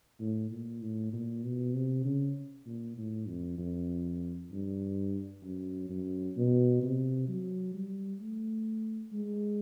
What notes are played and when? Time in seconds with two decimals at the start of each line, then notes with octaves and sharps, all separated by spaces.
0.20 A2
0.51 A#2
0.81 A2
1.13 A#2
1.44 B2
1.74 C3
2.05 C#3
2.66 A#2
2.97 A2
3.28 F2
3.59 F2
4.52 G2
5.43 F#2
5.89 F#2
6.37 B2
6.83 C3
7.28 F#3
7.74 G3
8.21 A3
9.13 G#3